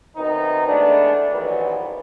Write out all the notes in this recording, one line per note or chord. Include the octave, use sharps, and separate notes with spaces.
F#2 D#3 B3 C4 D#4
E3 G#3 A3 B3 D4
A#1 D#3 E3 F#3 G3 B3